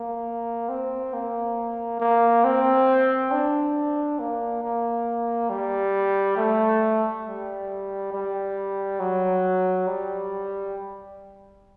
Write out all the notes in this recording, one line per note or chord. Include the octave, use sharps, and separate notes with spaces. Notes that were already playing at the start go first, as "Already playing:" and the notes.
Already playing: A#3
C4
A#3
A#3
C4
D4
A#3
A#3
G3
A3
G3
G3
F#3
G3